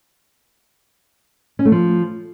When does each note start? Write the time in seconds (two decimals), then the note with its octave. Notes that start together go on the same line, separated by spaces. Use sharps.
1.59 C#4
1.65 A3
1.72 F3